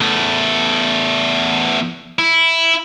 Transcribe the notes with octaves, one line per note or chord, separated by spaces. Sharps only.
E2 A3
E4